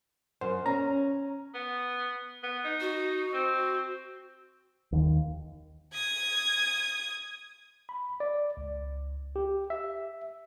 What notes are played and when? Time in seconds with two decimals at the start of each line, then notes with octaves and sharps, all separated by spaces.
0.41 F#2 C5
0.66 C#4 A#5
1.54 B3
2.43 B3
2.64 D#4
2.81 F#4
3.33 C4
4.92 D#2
5.93 D#6 G#6
7.89 B5
8.20 D5
8.57 C#2
9.36 G4
9.70 E5